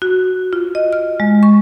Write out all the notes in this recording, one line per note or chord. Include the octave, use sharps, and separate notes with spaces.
F#4
F4
D#5
F6
G#3
C#6